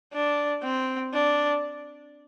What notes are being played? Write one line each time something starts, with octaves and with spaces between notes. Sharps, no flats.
D4
C4
D4